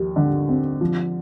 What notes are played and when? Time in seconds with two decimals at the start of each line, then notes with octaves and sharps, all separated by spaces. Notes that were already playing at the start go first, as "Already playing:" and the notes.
Already playing: D#2 F3
0.16 D3
0.49 C4
0.81 F3